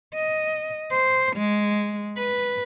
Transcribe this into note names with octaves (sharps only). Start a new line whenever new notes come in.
D#5
C5
G#3
B4